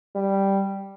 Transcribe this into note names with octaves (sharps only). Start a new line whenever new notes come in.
G3